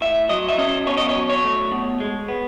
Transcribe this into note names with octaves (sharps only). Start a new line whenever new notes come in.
A2 E5
F#3 D#5
E5
C#4 D#5
B2 C#5
D#5
C#5
F#3
C#5
A3
B2
G#3
B3